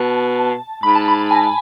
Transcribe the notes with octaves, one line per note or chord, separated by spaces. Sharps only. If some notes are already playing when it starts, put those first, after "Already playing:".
Already playing: B2 A5
G#2 B5
A5
B5
G#5